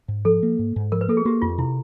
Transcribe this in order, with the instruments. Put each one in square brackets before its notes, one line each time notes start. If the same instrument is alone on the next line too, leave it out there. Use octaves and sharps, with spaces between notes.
[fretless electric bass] G#2
[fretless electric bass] F3 [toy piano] A4
[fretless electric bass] A#3
G#2
G#2
[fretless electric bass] F3 [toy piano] A#4
[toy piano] B4
[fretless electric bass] A#3 [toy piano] A4
[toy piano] G#4
[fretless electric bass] A#3 [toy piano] G4
[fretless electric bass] F2 [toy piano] F4
[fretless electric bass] C3 [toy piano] E4